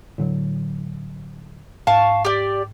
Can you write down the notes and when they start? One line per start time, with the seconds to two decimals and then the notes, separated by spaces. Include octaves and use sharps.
0.18 A2 D3 F#3
1.87 G#2 F5 A5 C#6
2.25 G4 D5